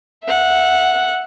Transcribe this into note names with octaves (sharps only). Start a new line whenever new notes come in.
E5 F#5